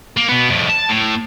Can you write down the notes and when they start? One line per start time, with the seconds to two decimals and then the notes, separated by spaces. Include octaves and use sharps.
0.17 A#3
0.29 B2 B3
0.50 F2 A2
0.69 A5
0.89 A2